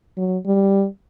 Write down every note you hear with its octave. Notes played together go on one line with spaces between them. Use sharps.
F#3
G3